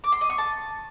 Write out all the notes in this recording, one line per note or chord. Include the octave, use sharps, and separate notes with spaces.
D6
C6
D#5
C#6
A5